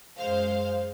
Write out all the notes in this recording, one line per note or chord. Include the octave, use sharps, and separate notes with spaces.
F#2 G#3 C5 F5